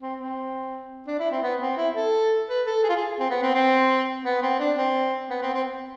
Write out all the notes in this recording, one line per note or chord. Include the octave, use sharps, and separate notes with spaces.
C4
C4
D4
E4
C4
B3
C4
E4
A4
B4
A4
G#4
F4
G#4
C4
B3
C4
C4
B3
C4
D4
C4
B3
C4
C4